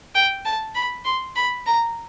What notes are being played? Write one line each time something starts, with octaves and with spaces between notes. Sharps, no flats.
G5
A5
B5
C6
B5
A#5